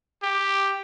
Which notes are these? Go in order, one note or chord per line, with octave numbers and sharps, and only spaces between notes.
G4